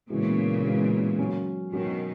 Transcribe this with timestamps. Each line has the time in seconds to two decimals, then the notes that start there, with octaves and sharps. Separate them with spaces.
0.10 A#2 C#3 E3 G#3 B3 F#4
0.65 E3 G#3 B3 F#4
1.19 F#3 C#4 F#4
1.72 B2 D#3 F#3 C#4 F#4